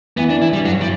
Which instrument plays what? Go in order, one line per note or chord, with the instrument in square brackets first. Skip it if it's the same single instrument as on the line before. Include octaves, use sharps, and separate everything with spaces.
[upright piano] E3 [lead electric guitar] B3
[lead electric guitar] D4
[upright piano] E3 [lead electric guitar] E4
[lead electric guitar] G3
[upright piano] G2 [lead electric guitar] F#3
[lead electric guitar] G3